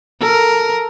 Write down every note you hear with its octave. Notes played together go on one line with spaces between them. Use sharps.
A4 A#4